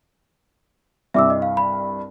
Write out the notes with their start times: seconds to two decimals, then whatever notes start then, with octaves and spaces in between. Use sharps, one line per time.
1.14 C2 G2 E5 D6 E6
1.30 D#5
1.42 F5
1.57 B5